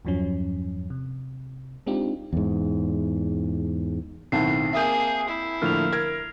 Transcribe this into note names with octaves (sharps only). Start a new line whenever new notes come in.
E2 G2 F3 F#3 C#4
C3
G#3 C4 D4 D#4 F4 G4
E2 G#2
B1 A2 D#3 C4 F#5 A5 C7
A#3 G#4 E5 D#6 G6
E4
A2 D3 F3 A#3 F6 F7
A#4 G#6